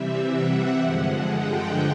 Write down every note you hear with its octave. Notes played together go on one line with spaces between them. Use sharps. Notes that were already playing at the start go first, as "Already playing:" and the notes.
Already playing: C3 E3 G3 C4 E5
F#5
G2 D3 F3 G#3 F#5
G5